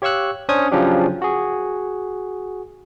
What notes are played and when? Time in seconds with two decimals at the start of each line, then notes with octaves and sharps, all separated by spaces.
0.02 G4 C#5 F5 C#6 E6 F#6
0.49 C#4 D4 C5 D#6 G#6
0.71 C#3 F3 F#3 C#4 D4 G4
1.22 F#4 G#4